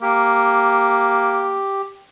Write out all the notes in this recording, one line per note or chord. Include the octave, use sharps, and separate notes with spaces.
A#3 G4